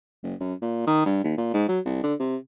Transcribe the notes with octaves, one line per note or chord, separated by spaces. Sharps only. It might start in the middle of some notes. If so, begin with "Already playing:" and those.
F#1
F#2
A#2
D#3
G2
D#2
A#2
G#2
F#3
C2
D3
C3